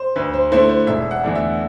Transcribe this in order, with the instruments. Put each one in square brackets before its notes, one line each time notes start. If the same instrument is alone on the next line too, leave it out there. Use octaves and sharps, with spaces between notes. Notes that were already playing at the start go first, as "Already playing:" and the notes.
Already playing: [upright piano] C5
[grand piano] D2 [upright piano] B4
[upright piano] C5
[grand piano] D3 A3 E4 [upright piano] C5
[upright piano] C5
[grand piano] E1 [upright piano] E5
[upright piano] F#5
[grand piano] E2 D3 A3 D4
[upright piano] E5